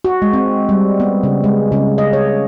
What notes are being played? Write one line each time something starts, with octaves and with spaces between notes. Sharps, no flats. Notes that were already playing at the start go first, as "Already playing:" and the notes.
F#4
G#3
C4
G3
B3
C#3
G#3
C#3
D#5
C#5